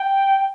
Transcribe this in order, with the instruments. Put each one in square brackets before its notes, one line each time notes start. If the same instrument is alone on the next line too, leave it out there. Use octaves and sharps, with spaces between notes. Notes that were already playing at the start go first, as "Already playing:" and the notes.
Already playing: [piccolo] G5